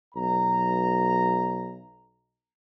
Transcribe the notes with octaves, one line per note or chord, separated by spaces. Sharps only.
B1 A#5